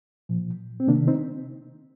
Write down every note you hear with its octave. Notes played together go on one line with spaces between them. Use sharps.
A#2 F3
C4
C3 D#3 A#3 D4
C4 D#4